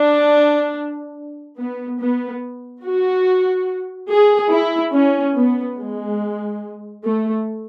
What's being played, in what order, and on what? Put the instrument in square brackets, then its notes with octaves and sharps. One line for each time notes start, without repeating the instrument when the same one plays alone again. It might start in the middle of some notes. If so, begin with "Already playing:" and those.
Already playing: [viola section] D4
B3
B3
F#4
G#4
E4
C#4
B3
G#3
A3